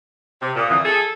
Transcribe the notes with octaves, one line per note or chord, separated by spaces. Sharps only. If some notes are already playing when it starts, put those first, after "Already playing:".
C3
A#2 D#6
F2 D3 E3
G#4 A4